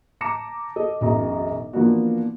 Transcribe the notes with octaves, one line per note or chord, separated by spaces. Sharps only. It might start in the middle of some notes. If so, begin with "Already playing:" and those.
A5 A#5 D6 A#6 C#7 E7
A4 D#5
E1 B1 F#2 D#5 A#5
E3 F3 A#3 B3 D4 F#4